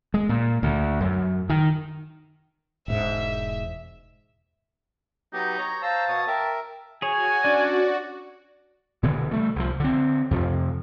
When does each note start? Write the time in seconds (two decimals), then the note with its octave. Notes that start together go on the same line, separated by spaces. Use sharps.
0.14 G#3
0.29 A#2
0.63 D2
1.01 F#2
1.50 D#3
2.88 E1 G#2 E5
5.33 F#3 B3 D#4 G4
5.59 C#5 A#5
5.82 C5 F5 A5 A#5 E6
6.08 B2 C#5 D#6
6.27 A#4 E5 G5
7.02 F#4 G#4 C#5 G#5
7.44 C#4 D4 D5
9.03 B2 D3 E3 B3
9.31 G3 A3 B3
9.56 C2 F3
9.80 D3 C4
10.31 F2 C3 F3